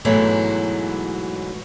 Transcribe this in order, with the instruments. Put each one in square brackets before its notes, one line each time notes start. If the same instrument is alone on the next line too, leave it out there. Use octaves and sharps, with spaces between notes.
[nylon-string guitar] G#2 B2 E3 F#3 G#3 A3